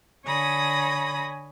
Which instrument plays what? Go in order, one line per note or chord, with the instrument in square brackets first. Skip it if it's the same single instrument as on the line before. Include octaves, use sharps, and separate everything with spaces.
[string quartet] D3 C#5 G#5 B5 D#6 A#6